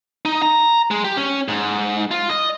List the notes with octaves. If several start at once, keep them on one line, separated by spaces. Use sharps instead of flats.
D#4
A#5
G#3
G4
C#4
G#2
F4
D#5